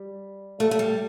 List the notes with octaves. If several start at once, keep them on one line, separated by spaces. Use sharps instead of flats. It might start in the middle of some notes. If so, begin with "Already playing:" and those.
Already playing: G3
A3
A3
G3